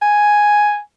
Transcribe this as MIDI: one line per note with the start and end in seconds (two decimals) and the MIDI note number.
0.02 0.79 80